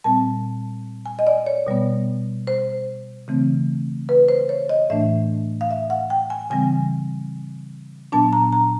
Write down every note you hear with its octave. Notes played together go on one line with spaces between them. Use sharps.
A#2 G3 C4 A5
G#5
D#5
D5
C#5
B2 G3 B3
C5
C#3 E3 A3 C4
B4
C5
C#5
D#5
A2 E3 A3 D4 E5
F5
E5
F#5
G5
G#5
C#3 E3 G3 C4 G#5
A#2 F#3 B3 D4 A5
A#5
A#5